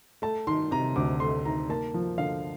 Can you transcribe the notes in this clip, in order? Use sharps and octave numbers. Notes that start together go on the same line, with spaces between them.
A3 A5
D#3 C6
C3 A#5
D2 D6
A3 C6
D#3 A#5
A#3 A5
F3
D3 F5